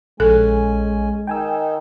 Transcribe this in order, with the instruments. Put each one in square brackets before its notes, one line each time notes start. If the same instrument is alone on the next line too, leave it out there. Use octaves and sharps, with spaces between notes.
[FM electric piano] A#1 [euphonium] G#3 [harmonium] C#4 G#5 [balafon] A4
[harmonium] D#3 D#4 [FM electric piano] G5 G#5 E6